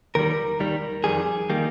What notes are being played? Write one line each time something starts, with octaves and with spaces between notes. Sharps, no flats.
D#2 D#3 G3 A#4
D#2 D#3 G3
F2 D#3 G3 G#4
D#3 G3 A#3